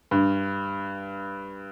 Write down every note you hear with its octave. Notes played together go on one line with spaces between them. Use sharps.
G2